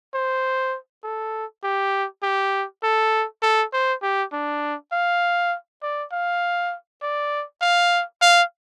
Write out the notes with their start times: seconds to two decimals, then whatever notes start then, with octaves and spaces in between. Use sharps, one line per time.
0.14 C5
1.04 A4
1.64 G4
2.23 G4
2.83 A4
3.43 A4
3.73 C5
4.02 G4
4.33 D4
4.92 F5
5.83 D5
6.12 F5
7.02 D5
7.61 F5
8.22 F5